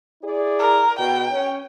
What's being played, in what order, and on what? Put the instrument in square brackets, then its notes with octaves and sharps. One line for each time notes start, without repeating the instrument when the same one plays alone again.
[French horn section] E4 G#4 D5
[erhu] A#4
[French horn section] B2 [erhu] G5
[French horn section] C#4